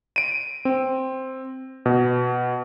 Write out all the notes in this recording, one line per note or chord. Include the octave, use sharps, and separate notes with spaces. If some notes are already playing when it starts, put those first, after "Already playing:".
D7 D#7
C4
B2